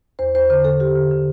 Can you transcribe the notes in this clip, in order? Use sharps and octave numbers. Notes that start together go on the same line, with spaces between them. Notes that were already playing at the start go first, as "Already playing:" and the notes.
E2 C5
E2 C5
D3 C5
D3 A4
D3 G4
D3
D3